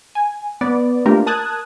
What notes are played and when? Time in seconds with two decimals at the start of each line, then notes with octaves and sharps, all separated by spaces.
0.15 G#5
0.61 B3 D5
1.06 A3 A#3 D4 F4 G4 A#4
1.26 A#4 A5 D#6 F#6 G#6